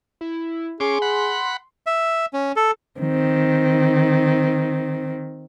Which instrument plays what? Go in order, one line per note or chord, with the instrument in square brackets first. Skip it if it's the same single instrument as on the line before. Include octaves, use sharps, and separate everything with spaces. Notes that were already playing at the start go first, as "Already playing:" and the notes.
[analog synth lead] E4
[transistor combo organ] C#4 D6 [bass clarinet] G#4 [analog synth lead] C6
[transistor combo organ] F#5 B5
[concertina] E5
C#4
A4
[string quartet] D#3 C4